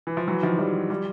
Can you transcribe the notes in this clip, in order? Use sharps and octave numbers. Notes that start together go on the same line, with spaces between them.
E3
F3
E3 F#3
D#3 F3
F3 G3
F3 G3